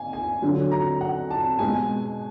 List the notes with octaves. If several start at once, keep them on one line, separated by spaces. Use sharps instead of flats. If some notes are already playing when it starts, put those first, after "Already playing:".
Already playing: F5 G#5
G#5
D3 F#3
A#5
F#5
A5
B2 G#3 G#5